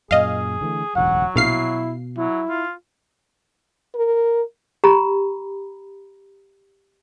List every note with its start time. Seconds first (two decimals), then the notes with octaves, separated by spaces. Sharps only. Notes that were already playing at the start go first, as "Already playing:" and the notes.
0.11 F#2 A#2 G#4 D#5 F5
0.61 D3 E3 A3
0.96 E1 A1 D2 F#3 F#5
1.36 A#1 B2 E4 F5 C7
2.18 F#3 E4
2.49 F4
3.95 A#4
4.84 G4 A#5 B5